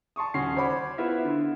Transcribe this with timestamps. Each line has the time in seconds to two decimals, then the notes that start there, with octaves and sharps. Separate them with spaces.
0.16 A5 C6 C#6 D#6
0.34 D#1 C#4 F#4 C7
0.56 C5 C#5 F#5 B5 D6
0.98 B3 E4 F4 E5
1.25 D3